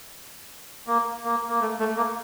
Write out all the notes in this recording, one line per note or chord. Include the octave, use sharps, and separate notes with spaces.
A#3
A#3
A#3
A3
A3
A#3